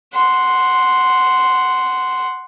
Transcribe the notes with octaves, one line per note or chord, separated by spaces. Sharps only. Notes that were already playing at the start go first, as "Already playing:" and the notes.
F#5 C6